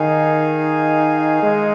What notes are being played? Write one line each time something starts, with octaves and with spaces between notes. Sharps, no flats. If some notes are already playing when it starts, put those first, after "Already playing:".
Already playing: D#3 D#4 G#4 F5 G#5
G#3